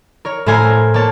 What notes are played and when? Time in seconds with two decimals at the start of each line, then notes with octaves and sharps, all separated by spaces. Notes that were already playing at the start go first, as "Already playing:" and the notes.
0.25 A#4 C#5
0.46 A2 A3 C5 G#5 A#5 F6
0.94 A#3 C#5 A5